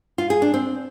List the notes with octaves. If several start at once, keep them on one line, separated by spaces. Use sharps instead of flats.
F4
G#4
D4
C4